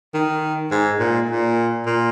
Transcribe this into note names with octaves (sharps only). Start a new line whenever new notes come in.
D#3
G#2
A#2
A#2
A#2